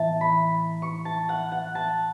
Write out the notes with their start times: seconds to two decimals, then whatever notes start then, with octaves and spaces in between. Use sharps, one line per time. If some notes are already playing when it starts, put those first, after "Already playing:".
Already playing: A2 E3 B3 E5 A5
0.21 B5
0.82 C#6
1.05 A5
1.29 F#5
1.52 F#5
1.75 A5